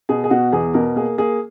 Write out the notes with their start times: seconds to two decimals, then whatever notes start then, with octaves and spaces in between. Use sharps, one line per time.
0.09 B2 G#4
0.24 G#4
0.30 B2 F#4
0.52 E2 G#4
0.74 B2 A#4
0.96 A#3 G#4
1.18 A#3 G#4